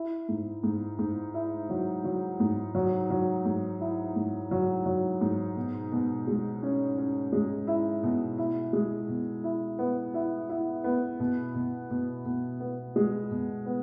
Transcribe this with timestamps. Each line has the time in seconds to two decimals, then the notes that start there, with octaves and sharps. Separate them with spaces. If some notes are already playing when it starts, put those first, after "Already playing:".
Already playing: E4
0.29 G#2
0.63 G#2
0.99 G#2
1.34 E4
1.70 F#3
2.04 F#3
2.40 G#2
2.75 F#3
3.10 F#3
3.45 G#2
3.80 E4
4.16 G#2
4.51 F#3
4.86 F#3
5.21 G#2
5.56 B2
5.92 B2
6.27 G#3
6.63 C#4
6.98 C#4
7.32 G#3
7.67 E4
8.03 B2
8.38 E4
8.73 G#3
9.09 B2
9.44 E4
9.79 B3
10.14 E4
10.50 E4
10.84 B3
11.20 B2
11.55 B2
11.91 B2
12.25 B2
12.60 B3
12.96 G#3
13.31 B2
13.66 B3